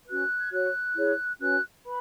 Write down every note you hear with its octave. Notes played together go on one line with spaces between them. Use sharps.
C#4 F#4 B4 F#6
G#6
F#4 C#5 F#6
E4 G#4 C#5
C#4 F#4 B4 F#6
B4 B5